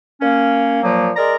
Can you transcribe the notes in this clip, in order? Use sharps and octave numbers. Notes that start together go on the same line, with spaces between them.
A#3 C#4
A#2 F3 F#3 A#3
G#3 A#4 D5 A#5